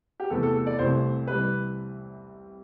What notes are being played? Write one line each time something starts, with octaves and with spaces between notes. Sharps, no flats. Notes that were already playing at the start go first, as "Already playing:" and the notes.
G4
E2 C3 E3 A3 A4
A4
A4
D5
C2 C3 E3 A3 E4 C5
C3 E3 G3 B4